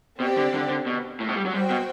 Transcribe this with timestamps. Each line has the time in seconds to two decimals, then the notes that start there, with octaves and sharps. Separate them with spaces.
0.20 B2 C4 G4 D5
0.37 D3
0.54 D3
0.70 D3
0.86 B2
1.20 A2
1.29 B2
1.36 G3
1.45 F#3
1.53 G3 F#4 C5 G5
1.70 B2